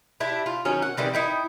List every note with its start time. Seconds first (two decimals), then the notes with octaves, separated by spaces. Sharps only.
0.20 D4 E4 G4
0.46 F4
0.65 D#3 F#3 C#4
0.82 F#5
0.97 D#3 E3 G3 C4
1.13 D#4 E4 G5